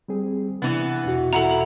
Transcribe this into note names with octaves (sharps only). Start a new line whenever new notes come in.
G3 C4 G#4
C3 E3 B3 D4
E2 B2 F#4
E4 A4 F#5 A#5